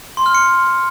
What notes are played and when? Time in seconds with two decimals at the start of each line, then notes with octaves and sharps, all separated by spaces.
0.17 C6
0.26 F6
0.35 C#7